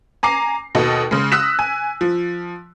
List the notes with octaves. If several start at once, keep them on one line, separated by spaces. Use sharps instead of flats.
G#5 A#5 D6 C7
D#2 B2 A4 D#5
C#3 G#3
D#6 E6 F#6 A#6 B6 E7
G#5
F3